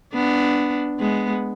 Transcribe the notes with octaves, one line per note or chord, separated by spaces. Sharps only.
B3 D4
G#3 B3